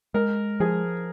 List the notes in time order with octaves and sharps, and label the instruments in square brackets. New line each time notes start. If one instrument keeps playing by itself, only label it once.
[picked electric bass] G#3 [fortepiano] A#4
[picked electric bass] F3 [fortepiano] G#4